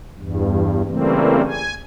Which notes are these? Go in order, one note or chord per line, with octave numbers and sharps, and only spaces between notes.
E2 G2
C#3 E3 G3 A3 A#3 C4
G#5